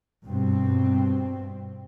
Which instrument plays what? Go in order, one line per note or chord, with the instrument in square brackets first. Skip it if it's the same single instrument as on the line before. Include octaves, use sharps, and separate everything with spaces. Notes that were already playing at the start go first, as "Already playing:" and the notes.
[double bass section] G2 B2 C4